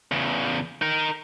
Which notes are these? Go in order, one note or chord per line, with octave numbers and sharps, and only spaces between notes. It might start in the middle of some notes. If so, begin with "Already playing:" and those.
E2 C#3
D#4 A#4